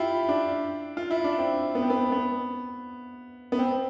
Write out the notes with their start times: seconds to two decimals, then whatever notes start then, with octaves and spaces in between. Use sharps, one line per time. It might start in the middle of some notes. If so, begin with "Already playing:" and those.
Already playing: E4 F4 G4
0.29 D4
0.97 F4
1.10 E4
1.24 D4
1.38 C4
1.75 B3
1.82 C4
1.90 B3
2.12 B3
3.52 B3
3.59 C4